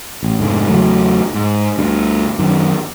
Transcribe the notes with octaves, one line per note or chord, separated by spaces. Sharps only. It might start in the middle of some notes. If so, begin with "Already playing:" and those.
A1
F1 G#2 D3
E2 C#3 F#3 A3
G#2
D2 G2
F#2 D3 D#3